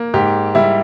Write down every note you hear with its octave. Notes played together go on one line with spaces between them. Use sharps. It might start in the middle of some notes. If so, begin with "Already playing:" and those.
Already playing: A#3
G#2 G4
G3 E4